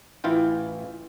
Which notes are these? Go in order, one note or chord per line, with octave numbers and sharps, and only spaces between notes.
A1 E3 E4 F4 G5